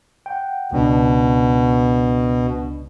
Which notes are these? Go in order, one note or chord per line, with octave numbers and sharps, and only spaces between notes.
F#5 G5
C#2 B2 D4